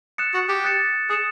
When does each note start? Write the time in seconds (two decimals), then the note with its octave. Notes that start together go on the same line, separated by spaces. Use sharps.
0.18 D#6 F#6 A6 C#7 E7
0.34 F#4
0.49 G4
0.64 D#6 F#6 A6 C#7 E7
1.10 G#4 D#6 F#6 A6 C#7 E7